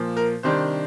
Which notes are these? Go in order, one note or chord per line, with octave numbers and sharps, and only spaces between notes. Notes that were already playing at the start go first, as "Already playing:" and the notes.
Already playing: A#2 F3 A#3
A#4
C3 D#3 G3 D4 C5